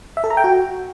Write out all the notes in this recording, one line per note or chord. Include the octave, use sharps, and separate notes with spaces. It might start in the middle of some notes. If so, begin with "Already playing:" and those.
E5
A4
A#5
G5
F#4